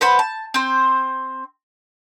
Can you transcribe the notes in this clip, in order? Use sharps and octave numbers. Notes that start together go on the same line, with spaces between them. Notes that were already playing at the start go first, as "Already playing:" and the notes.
B4 C5 F#5 B5
A5
C4 C5